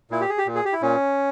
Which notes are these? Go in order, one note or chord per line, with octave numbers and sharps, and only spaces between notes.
A#2 E4
G4
G#4
G4
A#2
G#4
G4
E4
A#2 C#4